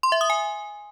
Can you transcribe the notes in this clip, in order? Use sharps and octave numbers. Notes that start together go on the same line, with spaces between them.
C6
E5
D#6
G#5